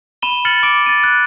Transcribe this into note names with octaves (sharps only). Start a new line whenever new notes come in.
B5 D#7 E7 G7
F6 A6 C#7 F#7
D6 D7
A6 D#7
F#6